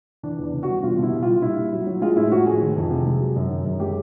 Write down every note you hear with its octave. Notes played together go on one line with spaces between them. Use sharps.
E3 D4
E2 D4
C#3
G3 F#4
B2 F4
B2 E4
G3
G3 F4
A#2 E4
A#2
F#3
F#3
G#3 F4
A2 E4
F3 F#4
A2 G#4
D#3
F2
C3
G#3
F#3
F#2
D#3
F#2
G#3 G4